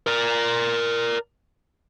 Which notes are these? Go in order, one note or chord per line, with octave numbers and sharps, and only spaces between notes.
A#4 D5